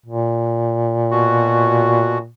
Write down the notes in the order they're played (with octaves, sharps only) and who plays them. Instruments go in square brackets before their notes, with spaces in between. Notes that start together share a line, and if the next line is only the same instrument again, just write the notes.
[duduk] A#2
[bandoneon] B2 F#4